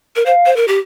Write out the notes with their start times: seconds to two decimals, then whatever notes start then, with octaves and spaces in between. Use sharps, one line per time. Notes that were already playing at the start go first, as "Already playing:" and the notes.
0.16 A#4
0.25 C5 F5
0.46 C5
0.56 A#4
0.68 G4